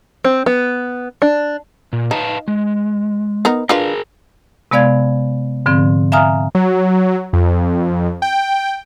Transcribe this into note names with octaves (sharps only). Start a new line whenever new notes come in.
C4
B3
D4
A#2
D#4 B4 F5 A5
G#3
B3 D#4 A#4
D4 F4 G#4 A#4 B4
C3 G#3 B3 D5 F5 G#6
G#2 D3 F3 C4
E5 F5 G#5 A#5 D#6 F6
F#3
F2
G5